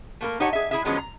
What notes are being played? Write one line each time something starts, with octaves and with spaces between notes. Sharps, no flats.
A3 A#3 A#4
D#4 G4 C#5 F#5 A5
G#4 E5
E4 G#4 E5
D3 F3 F#3 G#3 B3 C#4
A#5